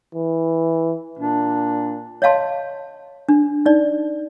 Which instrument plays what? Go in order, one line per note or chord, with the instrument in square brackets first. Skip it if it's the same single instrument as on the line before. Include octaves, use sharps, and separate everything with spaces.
[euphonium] E3
[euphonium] A#2 [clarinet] D4
[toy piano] C#5 D#5 F5 A5 C6
D4
D#4 D5